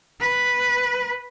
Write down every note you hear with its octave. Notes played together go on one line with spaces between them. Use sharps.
B4